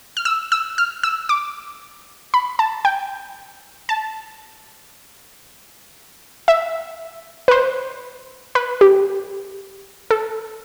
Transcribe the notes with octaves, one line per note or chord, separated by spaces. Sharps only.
F6
E6
E6
F6
E6
D6
B5
A5
G5
A5
E5
B4
C5
B4
G4
A4